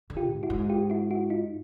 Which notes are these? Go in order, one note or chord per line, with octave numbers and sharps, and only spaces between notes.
D3
F4 G4
G#2
E4 F#4
G#2
F4 G4
E4 F#4
E4 F#4
D#4 F4